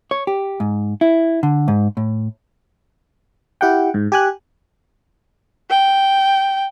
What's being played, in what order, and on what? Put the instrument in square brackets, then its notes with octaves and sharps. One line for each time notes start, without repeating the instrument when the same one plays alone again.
[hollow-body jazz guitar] C#5
G4
G#2
E4
D3
G#2
A2
[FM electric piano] E4 G4 F#5 G5
G#2
G4 G#5 F#6
[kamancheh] G5